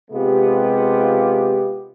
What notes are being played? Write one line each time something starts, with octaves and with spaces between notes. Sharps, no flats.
C3 G#3 B3 F4 G4